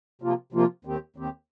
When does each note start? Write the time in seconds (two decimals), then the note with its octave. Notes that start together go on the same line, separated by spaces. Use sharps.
0.22 C3 F3 A#3 F4
0.53 C3 F3 A#3 F4
0.85 D#2 D#3 C4 G4
1.16 D#2 D#3 C4 G4